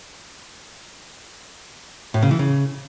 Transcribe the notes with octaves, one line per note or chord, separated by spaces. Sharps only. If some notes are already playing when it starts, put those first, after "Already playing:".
A2
C#3
E3
C#3